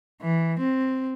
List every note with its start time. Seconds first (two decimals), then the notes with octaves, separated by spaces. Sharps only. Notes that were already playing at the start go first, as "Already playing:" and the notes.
0.22 E3
0.60 C4